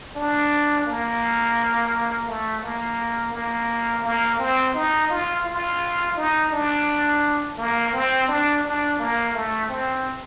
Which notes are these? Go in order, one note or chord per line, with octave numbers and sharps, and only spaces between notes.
D4
A#3
A3
A#3
A#3
A#3
C4
D#4
F4
F4
D#4
D4
A#3
C4
D4
D4
A#3
A3
C4